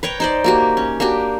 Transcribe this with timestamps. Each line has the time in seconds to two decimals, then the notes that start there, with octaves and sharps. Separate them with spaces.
0.03 B4 C#5 G5 A#5
0.20 D#4 C5 D5
0.44 A#3 F#4 G4
0.77 C#4
1.00 A#3 D4 F#4 G4